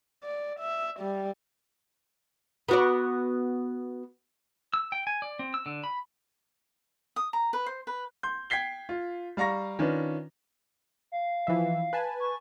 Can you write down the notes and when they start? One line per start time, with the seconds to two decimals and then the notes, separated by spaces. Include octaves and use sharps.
0.24 D5
0.60 E5
1.00 G3
2.69 B3 F#4 D5
4.74 E6
4.92 G5
5.07 G#5
5.22 D5
5.39 C4
5.54 E6
5.66 D3
5.84 B5
7.16 D#6
7.33 A#5
7.53 B4
7.66 C5
7.87 B4
8.23 C6 G6
8.50 G5 G#6 B6 C7 G7
8.89 F4
9.37 G3 F5 A#5 C#6 A#6
9.79 D#3 C#4 D4 F4 B4
11.12 F5
11.47 E3 F3 E5
11.93 B4 G#5 A5
12.20 C#6